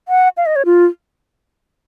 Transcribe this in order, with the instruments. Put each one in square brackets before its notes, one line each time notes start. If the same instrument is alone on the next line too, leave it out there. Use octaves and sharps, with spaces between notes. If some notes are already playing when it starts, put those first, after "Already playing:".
[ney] F#5
F5
D#5
C#5
F4